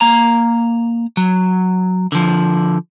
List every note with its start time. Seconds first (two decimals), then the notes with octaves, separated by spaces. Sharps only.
0.01 A#3 A#5
1.17 F#3
2.12 D3 F3